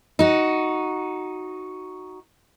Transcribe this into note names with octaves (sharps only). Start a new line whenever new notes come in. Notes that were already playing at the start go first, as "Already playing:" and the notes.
D#4 F#4